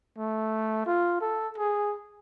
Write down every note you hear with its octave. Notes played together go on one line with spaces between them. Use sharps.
A3
F4
A4
G#4